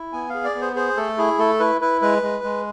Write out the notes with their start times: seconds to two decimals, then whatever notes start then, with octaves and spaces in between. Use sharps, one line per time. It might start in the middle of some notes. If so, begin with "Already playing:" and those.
Already playing: E4
0.13 B3 G#5
0.29 G#4 F5
0.44 D5
0.55 B3
0.61 C5
0.76 G#4 C5
0.97 A3 A4
1.18 E4 G#4
1.39 A3 A4
1.60 E4 B4
1.81 E4 B4
2.01 G#3 B4
2.22 G#3
2.44 G#3